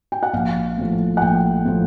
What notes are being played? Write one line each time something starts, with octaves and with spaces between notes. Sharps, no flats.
G5
F#5
A#1 F5
A2 F3
F#5
A#1 G5
A2 F3